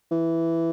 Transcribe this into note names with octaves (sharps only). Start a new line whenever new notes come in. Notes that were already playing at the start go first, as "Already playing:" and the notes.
E3